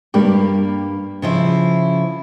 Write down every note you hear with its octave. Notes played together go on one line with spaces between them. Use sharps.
G2 G3 A#3 G4
C#3 F3 E4